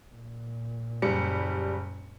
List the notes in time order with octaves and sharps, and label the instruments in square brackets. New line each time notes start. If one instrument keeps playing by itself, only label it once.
[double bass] A#2
[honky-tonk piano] F#1 G3 C#7